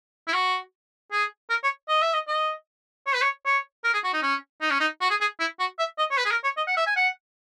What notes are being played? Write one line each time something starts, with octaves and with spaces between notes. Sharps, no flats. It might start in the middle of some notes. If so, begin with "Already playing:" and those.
E4
F#4
G#4
A#4
C#5
D#5
E5
D#5
D#5
C#5
B4
C#5
C#5
A#4
G#4
F#4
D#4
C#4
D#4
C#4
D#4
F#4
G#4
G#4
E4
F#4
E5
D#5
C#5
B4
G#4
A#4
C#5
D#5
F#5
E5
G#5
F#5